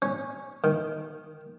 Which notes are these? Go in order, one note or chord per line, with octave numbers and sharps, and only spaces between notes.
C#4
D#3